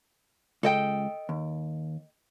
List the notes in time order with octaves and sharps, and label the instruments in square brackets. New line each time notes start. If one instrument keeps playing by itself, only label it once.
[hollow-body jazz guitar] C#2 [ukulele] A4 D#5 G5
[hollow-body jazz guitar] D#2